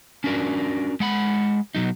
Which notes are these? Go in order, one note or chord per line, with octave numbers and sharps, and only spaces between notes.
C#4 D4 F#4 A#4 D5
G#3 F#5 B5
B2 F#3 D#4